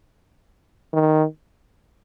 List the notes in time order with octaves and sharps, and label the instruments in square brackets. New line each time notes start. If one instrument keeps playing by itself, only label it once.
[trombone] D#3